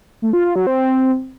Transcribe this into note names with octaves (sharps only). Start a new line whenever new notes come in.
A3
F4
F4
F#3
C4